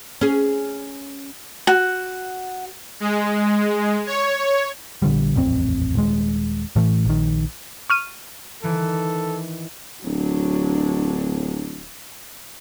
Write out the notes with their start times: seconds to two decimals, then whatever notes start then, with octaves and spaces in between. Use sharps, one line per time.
0.21 C#4 G#4
1.67 F#4
3.00 G#3
4.07 C#5
5.02 A#1 D3 G3
5.36 D#1 A1 F2 C4
5.95 D#1 G#3
6.76 A2 E3 A3
7.05 A#1 D#3
7.90 C#6 F6 D#7
8.63 D#3 E3 A4
10.04 D1 F#3 D4